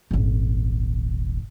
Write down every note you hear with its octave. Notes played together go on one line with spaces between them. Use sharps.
D#1 G#1